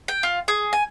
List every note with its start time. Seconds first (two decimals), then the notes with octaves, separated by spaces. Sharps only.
0.08 G5
0.23 F4
0.48 G#4
0.73 G#5